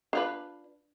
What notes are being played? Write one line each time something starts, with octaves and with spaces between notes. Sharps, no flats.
D4 F4 B4